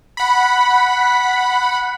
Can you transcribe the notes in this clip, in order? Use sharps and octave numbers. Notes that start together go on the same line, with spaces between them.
F#5 B5